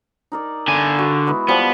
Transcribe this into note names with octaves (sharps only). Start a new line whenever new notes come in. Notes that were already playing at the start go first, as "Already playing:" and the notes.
D#4 A#4 D5
D3 G#5
F#4 D5
G#3 B3 E4
F3 G3 B3 C5